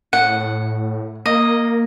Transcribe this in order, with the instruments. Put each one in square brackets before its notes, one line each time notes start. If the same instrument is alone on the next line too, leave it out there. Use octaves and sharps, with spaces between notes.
[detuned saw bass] A2 [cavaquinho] F#5
[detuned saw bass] A#3 [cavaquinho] D#5